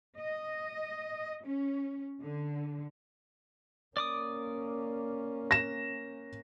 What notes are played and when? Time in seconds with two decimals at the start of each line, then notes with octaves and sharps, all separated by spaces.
0.17 D#5
1.44 C#4
2.20 D3
3.97 A#3 C#4 D5 D6 D#6
5.51 A#6 E7